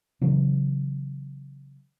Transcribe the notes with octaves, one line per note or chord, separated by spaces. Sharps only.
C#3 E3 F#3